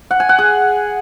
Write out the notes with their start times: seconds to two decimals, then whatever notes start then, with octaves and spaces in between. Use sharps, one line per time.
0.11 F#5
0.20 G#5
0.29 F#5
0.39 G#4